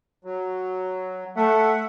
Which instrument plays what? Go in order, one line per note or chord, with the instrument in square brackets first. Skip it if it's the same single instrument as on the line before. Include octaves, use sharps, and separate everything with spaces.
[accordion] F#3
[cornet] A3 [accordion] E5 F#5